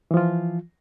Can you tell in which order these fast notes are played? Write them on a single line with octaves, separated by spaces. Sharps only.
E3 F3 F4